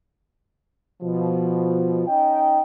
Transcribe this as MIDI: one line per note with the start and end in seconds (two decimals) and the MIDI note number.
1.02 2.05 47
1.02 2.05 53
2.07 2.60 61
2.07 2.60 63
2.07 2.60 75
2.07 2.60 79